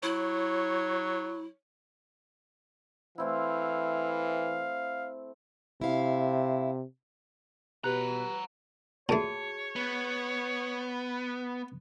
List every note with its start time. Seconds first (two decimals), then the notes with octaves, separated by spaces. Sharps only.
0.03 F#3 E4 C#5
3.18 E3 A3 C4 E4 F5
5.81 C3 E4 F5
7.84 B2 G4 B4 F#5 A#5 F#6
9.09 A#2 A3 F#4 G#4 C#5 A5
9.76 B3